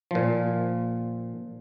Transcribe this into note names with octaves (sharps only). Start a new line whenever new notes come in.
A#2 F3